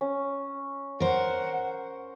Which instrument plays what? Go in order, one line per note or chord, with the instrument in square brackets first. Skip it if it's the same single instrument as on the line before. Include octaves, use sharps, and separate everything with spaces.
[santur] C#4
[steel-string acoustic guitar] A#4 C5 [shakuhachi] F#5